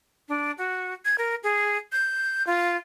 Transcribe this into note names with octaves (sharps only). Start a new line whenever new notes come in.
D4
F#4
G#6
A#4
G#4
G6
F4